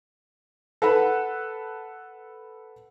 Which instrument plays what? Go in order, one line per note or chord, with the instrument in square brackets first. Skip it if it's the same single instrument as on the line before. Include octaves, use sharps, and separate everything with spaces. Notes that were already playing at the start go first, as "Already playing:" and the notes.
[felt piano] A4 B4 F#5 B5